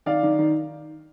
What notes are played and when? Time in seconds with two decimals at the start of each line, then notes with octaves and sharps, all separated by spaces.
0.06 D#3 D5 F5
0.23 D#3
0.39 D#3